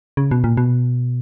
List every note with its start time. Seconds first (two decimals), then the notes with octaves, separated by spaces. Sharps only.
0.17 C#3
0.31 B2
0.44 A#2
0.57 B2